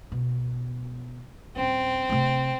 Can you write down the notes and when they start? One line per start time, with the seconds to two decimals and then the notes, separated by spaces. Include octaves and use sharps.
0.12 B2
1.56 D#1 C4 C#4
2.09 C3 A3